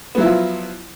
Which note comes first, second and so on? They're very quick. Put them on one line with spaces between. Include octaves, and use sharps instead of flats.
B3 F#3 E4 F3 F4